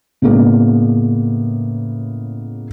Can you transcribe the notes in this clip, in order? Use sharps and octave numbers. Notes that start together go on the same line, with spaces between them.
A2 C#3 G#3 A#3 B3